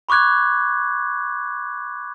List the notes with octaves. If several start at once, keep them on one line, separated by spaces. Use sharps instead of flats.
B5 C#6 D6 F#6 G#6